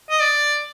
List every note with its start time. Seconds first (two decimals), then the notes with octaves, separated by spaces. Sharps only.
0.10 D#5
0.20 D5